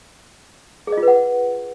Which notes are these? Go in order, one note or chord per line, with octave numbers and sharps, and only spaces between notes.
G#4
D#5
F4
B4
F#5